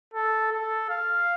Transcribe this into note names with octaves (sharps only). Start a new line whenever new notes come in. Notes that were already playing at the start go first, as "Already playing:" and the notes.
A4
A4
F5